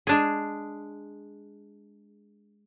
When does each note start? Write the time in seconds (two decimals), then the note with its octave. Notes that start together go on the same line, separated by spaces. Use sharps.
0.07 G#3 D4 G#4